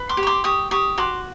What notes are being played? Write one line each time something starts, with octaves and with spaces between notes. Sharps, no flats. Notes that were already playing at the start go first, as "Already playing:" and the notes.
Already playing: B4
C6 D6
G4
C#6
C6 D6
G4 C#6 D#6
G4 C#6 D#6
F#4 C6 D6